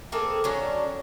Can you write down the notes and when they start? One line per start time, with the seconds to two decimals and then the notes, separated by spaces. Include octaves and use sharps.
0.12 A#3 C4 G#4 A4
0.44 F#3 C#4 D4